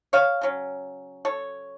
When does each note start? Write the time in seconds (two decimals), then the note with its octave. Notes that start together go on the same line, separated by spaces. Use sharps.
0.13 C#5 F5
0.41 C#3 F#3 C#4
1.25 A4 C#5